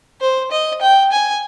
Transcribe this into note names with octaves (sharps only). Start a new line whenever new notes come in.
C5
D#5
G5
G#5